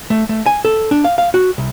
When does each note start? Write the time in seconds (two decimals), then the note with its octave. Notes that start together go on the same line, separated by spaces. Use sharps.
0.10 A3
0.29 A3
0.46 G#5
0.65 A4
0.91 D4
1.04 F5
1.18 F5
1.34 F#4
1.58 C2